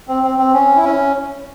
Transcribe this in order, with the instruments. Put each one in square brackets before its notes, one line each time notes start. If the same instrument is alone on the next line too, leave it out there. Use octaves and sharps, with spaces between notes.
[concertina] C4
C4
C4
C#4
E4
C#4